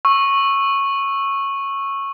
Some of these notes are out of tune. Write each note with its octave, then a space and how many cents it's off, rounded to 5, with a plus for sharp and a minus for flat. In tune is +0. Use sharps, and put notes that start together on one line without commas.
C#6 -10 E6 +0